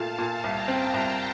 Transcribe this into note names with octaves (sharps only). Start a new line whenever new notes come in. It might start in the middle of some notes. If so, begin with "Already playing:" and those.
Already playing: A#2 A3 F5 A5
A#2
C2 G5 A#5
C4
F5 A5
C2